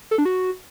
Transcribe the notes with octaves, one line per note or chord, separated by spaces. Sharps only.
A4
D4
F#4